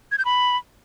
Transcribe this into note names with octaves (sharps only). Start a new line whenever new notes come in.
G#6
G6
B5